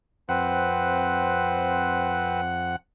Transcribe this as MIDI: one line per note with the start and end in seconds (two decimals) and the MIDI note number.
0.29 2.76 41
0.29 2.41 60
0.29 2.41 71
0.29 2.41 72
0.29 2.76 78